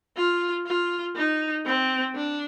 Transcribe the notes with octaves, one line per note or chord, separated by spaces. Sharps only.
F4
F4
D#4
C4
D4